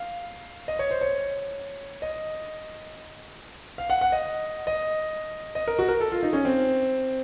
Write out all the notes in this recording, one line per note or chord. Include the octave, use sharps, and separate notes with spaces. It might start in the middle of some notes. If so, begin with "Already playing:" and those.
Already playing: F5
D#5
C#5
C5
C#5
D#5
F5
F#5
F#5
D#5
D#5
D#5
A#4
F#4
A#4
A4
F4
D#4
C#4
C4